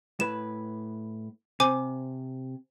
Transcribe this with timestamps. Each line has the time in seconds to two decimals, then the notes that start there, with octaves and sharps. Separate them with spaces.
0.20 A2 B4 E7
1.60 C3 C5 G#5 D6